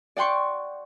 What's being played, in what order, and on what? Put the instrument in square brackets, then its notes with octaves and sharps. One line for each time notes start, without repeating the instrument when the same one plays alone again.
[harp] D5 F#5 G5 C6 C#6